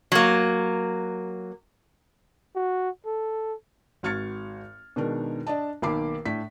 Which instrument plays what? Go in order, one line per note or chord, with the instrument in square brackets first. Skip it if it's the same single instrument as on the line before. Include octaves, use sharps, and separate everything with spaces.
[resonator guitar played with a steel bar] F#3 A#3
[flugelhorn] F#4
A4
[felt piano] G#1 F#4 F6 G#6 A6 C#7
B2 D#3 G#3 D4 D#4 A#4
D4 D5 D#5 A5
B1 D#3 A#3 B5 D6 C7
A2 D4 B6